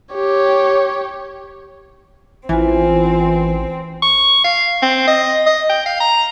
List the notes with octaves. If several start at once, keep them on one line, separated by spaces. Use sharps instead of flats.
G4 C#5
A1 E3 C4 F4 G#5
C#6
F5
C4
D#5
D#5
G5
F5
A#5